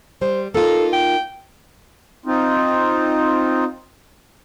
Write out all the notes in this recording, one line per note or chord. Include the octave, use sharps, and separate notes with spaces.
G3 C5
A#3 D#4 F4 A4
G5
C4 D#4 F4